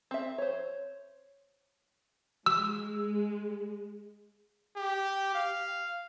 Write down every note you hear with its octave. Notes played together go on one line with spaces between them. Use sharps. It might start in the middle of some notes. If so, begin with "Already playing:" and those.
C4 E5
C5 C#5
G#3 E6
G4
F5